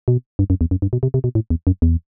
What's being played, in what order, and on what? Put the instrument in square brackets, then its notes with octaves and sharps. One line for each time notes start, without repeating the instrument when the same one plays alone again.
[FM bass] B2
G2
F#2
E2
F#2
G2
B2
C3
C3
B2
A2
E2
F#2
E2